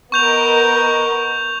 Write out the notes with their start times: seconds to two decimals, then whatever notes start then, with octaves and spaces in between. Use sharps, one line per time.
0.12 B3 A#4 D#5 C#6 G6 F7